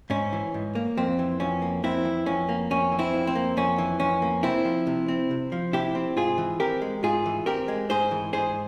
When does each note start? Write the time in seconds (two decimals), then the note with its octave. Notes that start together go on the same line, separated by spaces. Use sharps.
0.10 G#2 C#4
0.33 E3
0.54 G#2
0.75 A#3
0.97 F2 C4
1.19 E3
1.40 F2 C#4
1.62 A#3
1.83 F2 C4 E4
2.05 E3
2.26 F2 C#4
2.49 A#3
2.71 F2 C#4
2.92 E3
2.99 C4 E4
3.14 F2
3.27 C4
3.35 A#3
3.57 F2 C#4
3.78 E3
4.00 F2 C#4
4.22 A#3
4.43 C3 C4 E4
4.65 F3
4.87 C3
5.08 C4
5.31 C3
5.52 F3
5.73 C3 E4 G4
5.95 C4
6.16 G#2 F4 G#4
6.38 E3
6.60 C4 G4 A#4
6.82 G#3
7.03 G#2 F4 G#4
7.26 E3
7.46 C4 G4 A#4
7.68 G#3
7.90 G#2 G#4 C5
8.11 E3
8.33 G#2 G#4 C5